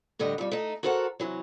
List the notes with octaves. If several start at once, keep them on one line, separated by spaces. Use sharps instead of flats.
A2 D3 G3 D#5
F2 G3
A3 D#4
F#4 A4 A#4 C5 F5 F#5
C3 E3 F#3